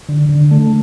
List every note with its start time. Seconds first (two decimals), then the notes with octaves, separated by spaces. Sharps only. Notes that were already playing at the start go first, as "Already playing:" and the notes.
0.09 D3
0.29 D3
0.51 A3